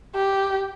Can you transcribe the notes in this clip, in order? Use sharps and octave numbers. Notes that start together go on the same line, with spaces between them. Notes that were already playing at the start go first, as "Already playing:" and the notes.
G4